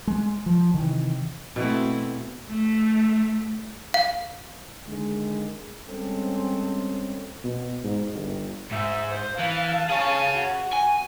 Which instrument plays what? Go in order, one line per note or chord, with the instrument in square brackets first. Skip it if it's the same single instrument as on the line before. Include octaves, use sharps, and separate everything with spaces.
[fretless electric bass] G#3
F3
C3 D#3 E3
[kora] B2 [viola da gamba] A3 C4 E4
[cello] A3
[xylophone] F5
[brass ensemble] D3 D#3 G#3
G3 G#3 C4 C#4 A4
[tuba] B2
G#2
G1
[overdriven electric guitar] G#2 [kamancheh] E5
[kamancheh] C5
[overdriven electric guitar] E3 [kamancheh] F5 A5
[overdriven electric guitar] G#4 C#5
[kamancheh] F#4
[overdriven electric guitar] G#5